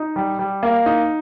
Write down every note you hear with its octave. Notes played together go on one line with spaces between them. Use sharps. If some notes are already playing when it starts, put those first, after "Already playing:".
Already playing: D#4
G3
G3
A#3
D#4